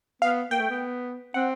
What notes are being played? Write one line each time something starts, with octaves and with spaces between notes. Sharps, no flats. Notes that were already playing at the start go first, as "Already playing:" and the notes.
B3 F5
A#3 G5
A3
B3
C4 F#5